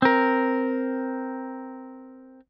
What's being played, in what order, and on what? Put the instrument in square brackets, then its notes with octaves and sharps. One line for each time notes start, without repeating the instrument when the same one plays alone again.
[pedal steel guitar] C4 A#4